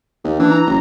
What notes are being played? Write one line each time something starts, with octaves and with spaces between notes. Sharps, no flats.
D#2
E3 D4
A#5
F#1